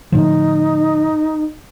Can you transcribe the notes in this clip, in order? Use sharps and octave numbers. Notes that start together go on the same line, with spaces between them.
A2 D3 F3 D#4